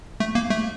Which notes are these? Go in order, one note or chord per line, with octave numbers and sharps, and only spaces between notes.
A3
A#3
A3